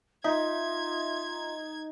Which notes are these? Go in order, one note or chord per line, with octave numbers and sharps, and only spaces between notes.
D#4 F4 E5 G#6